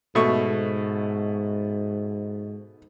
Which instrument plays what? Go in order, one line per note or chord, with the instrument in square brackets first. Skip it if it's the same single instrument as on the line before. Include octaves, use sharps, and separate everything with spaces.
[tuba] G#2 [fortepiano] B2 A3 C#6